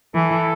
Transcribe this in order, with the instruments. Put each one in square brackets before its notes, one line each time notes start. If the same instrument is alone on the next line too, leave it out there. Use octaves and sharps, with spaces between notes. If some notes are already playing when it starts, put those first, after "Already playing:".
[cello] E3 [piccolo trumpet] A4